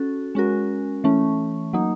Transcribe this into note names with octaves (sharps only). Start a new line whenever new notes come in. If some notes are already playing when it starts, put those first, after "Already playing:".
Already playing: C#4 F#4 A4
G#3 C#4 F#4 A#4
E3 A3 C#4
F#3 A#3 D#4